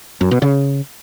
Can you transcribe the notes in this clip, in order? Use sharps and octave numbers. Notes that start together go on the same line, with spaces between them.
F#2
B2
C#3